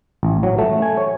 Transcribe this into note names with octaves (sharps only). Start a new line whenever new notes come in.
A1
F#3
A3
G#5
C#5